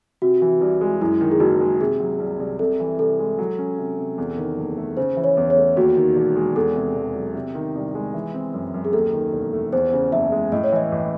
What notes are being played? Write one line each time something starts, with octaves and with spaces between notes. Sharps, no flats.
C3 F#4
E3
C2
G#3
F#2 E4
D#3
G#4
F#1 F#4
G#3
C3 G#4
F#3
C2
C2
C3 A4
E3
C2 A4
G#3
F#3
C#4
C3
C3
E2
D#3
F#1
A3
C#3 C5
E3
C#5
E2
C#5
A3
D#2 F#4
D#3
E1
G#3
E2 A4
C3
E1
F#3
C3
D#3
C2
G#3
E3
C4
F#2
F#2
G#4
D#2 A4
D#3
E1
A3
E2 C5
C#3
F#1 E5
G#3
A2 D#5
C#5
E3 D#5
A1